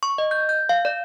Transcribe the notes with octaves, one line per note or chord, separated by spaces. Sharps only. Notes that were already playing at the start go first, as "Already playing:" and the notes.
C#6
D#5
G6
G6
F5
D5